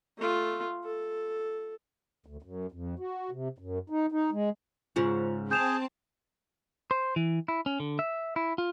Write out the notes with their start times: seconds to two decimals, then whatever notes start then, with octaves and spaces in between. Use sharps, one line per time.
0.18 A3 F4
0.84 A4
2.26 D2
2.42 F#2
2.72 F2
2.99 F#4
3.31 C3
3.58 F#2
3.90 D#4
4.12 D#4
4.32 G#3
4.96 G#2 C#3 C#4 F4
5.51 C4 G#4 C5 A5 G6 E7 F7
6.91 C5
7.16 E3
7.48 E4
7.66 C#4
7.80 D3
7.99 E5
8.36 E4
8.58 F4